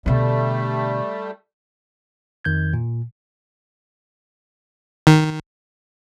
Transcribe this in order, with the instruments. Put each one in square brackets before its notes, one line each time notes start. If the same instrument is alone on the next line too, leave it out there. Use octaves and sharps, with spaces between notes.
[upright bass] B2 D3 [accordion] G3 A3
[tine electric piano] F2 D#3 G6 G#6
A#2
[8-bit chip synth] D#3